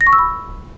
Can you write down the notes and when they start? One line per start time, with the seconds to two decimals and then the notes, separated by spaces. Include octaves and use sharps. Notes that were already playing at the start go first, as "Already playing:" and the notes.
0.01 A#6
0.07 C#6
0.13 E6
0.19 B5